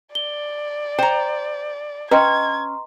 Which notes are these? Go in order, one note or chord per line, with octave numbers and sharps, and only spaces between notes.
D5 G7
C5 G5 A#5
C#4 B4 D#5 G5 A#5 C6 G#6